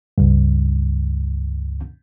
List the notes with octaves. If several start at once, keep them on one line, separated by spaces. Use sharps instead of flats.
C#2 G2